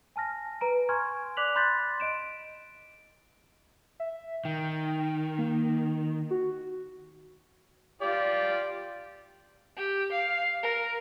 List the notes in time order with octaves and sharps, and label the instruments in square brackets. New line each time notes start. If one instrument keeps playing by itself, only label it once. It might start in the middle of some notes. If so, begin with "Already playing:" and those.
[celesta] G#5 A5 F6 A#6
B4 A#5 D7
G#5 C6 C#6 F6 G#6
D5 D6 F#6 B6 F7 F#7
B5 C6 F#6 G6 A6 B6
D#5 D7 E7
[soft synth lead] E5
[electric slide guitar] D#3 [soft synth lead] G5
[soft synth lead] A#3
F#4
[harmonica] F4 G4 D5
[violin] G4
F5
A#4